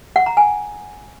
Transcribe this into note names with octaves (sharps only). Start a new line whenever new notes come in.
F#5
A#5
G#5